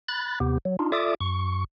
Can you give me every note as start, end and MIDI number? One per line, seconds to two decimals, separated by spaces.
0.08 0.39 83
0.08 0.39 90
0.08 0.39 93
0.40 0.58 39
0.40 0.58 48
0.40 0.58 59
0.40 0.58 67
0.65 0.77 54
0.79 0.92 62
0.79 0.92 63
0.79 0.92 65
0.92 1.15 65
0.92 1.15 69
0.92 1.15 74
0.92 1.15 76
0.92 1.15 86
0.92 1.15 87
1.20 1.64 42
1.20 1.64 85